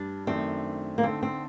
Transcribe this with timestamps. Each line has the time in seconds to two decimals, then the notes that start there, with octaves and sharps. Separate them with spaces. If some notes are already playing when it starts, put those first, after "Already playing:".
Already playing: G2 G3 D4
0.27 F#2 D#3 A3 C4 D4
0.98 A#3
1.03 D3 A3 C4 D#4 A4
1.23 C4